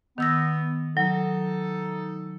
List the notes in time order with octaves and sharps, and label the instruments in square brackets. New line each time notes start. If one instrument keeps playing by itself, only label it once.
[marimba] D#3 E6 A#6 [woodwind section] B3
[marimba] F#3 [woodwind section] D#4 A4